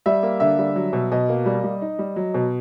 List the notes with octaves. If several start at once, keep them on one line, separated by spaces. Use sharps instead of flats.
G3 E5
A#3
D3 E5
G3
F#3
B2
B2 D#5
A#3
G3
G3
D#4
G3
F#3
B2